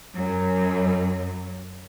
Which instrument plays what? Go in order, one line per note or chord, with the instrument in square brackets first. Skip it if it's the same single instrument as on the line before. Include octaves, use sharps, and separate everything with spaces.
[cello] F#2 F#3